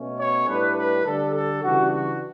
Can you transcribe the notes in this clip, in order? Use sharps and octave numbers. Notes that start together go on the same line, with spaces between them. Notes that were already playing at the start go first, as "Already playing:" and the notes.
Already playing: B2 A3 C#4
C#5
A2 G3 D4 B4
B4
D3 G3 D4 A4
A4
C#3 E3 G3 D4 F#4
F#4